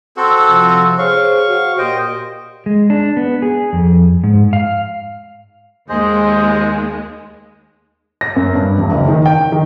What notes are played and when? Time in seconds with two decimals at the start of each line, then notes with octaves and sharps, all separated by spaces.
0.17 C4 F#4 A4
0.49 C3 F3
0.99 G#4 C5 C#5 F5 C#6
1.48 F#4 C5
1.78 A#2 G4 C5 D#5 G5
2.66 G#3
2.90 D4
3.17 B3
3.42 G#4
3.73 F2
4.24 G#2
4.53 F5
5.89 D#2 G#3 G#4 C5 D#5
8.21 A#6
8.36 F#2
8.55 G2
8.78 E1
8.91 F#1
9.08 D#3
9.26 G5
9.52 D#3